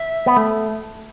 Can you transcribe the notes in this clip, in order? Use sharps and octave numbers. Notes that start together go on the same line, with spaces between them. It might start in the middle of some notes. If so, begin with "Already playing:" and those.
Already playing: E5
B3
A3